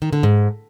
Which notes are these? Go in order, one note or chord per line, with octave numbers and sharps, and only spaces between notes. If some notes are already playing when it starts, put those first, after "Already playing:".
D#3
D3
G#2